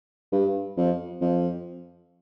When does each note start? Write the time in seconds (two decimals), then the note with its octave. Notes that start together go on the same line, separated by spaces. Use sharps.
0.32 G2
0.77 F2
1.21 F2